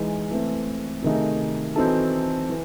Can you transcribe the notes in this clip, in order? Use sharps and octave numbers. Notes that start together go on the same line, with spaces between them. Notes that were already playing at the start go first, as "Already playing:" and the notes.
Already playing: E3 G#3 D#4
E3 A3 C4
C3 D#3 A3 D#4 G#4
E3 C4 D#4 F#4 A4
E3